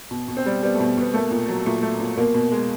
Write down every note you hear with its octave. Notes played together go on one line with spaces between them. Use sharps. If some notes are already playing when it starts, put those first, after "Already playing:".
B2
B2
C4
G3
G3 B3
A3
B2
B2 B3
A3 A#3
A#2
F#3
A#2 A3
A3
A#2
B2 A#3
B2
G#3